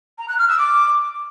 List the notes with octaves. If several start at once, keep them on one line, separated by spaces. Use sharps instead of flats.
A#5
F#6
F6
E6
D6